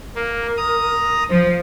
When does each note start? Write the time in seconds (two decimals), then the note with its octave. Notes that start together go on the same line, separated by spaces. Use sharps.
0.15 A#3 A#4
0.57 A#5 D#6
1.29 F3 C5